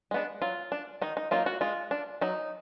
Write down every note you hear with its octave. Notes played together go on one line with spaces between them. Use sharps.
G#3 B3 D4
F#3 F4
D4
D#3 D#4
D#4
F#3 A#3 D#4 F4
F#4
G#3 F4
D4
F#3 D#4